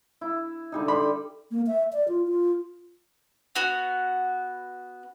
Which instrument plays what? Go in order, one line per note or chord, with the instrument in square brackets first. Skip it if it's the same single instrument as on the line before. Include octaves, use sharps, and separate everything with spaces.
[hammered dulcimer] E4
D3 G3 D#4
[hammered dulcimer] G3 G4 [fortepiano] B5 C6
[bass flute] A#3
E5
D5
F4
F4
[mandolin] B3 F#4